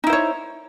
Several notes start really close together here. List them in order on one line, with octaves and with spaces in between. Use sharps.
D#4 E4 C5 C#5